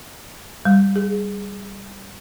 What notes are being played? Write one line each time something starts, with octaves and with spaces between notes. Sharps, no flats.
G3
G#4